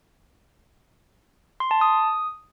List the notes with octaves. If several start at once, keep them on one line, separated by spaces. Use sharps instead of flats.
C6
A5
D#6